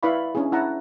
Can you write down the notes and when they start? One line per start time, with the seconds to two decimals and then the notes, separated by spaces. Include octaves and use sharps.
0.03 E4 B4 D5 F5 B5 C#6
0.35 C#4 D4 E4 G#4
0.52 E4 F#5 A5 A#5